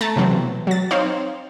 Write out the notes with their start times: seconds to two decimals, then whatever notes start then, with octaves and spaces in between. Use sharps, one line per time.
0.01 A3 A5 A#5
0.16 C3 E3 F#3 C4
0.31 B2
0.67 F#3 A6
0.91 C4 D#4 C5 C#5 F5